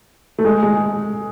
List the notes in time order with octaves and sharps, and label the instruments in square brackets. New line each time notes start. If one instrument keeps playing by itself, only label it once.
[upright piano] A3
G#3
G#3